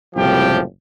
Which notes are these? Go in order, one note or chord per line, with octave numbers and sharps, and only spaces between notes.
F#1 C2 A2 F3 G4 G5